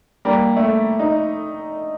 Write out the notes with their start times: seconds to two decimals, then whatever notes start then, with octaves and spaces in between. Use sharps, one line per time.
0.25 G3 A#3
0.57 A3
0.99 D#4